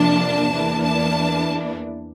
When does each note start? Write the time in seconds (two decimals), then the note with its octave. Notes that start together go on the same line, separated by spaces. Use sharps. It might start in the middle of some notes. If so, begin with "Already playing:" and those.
Already playing: F2 C3 F3 A#3 D4 A5
0.52 E2 E3 A#3 D4
0.84 A5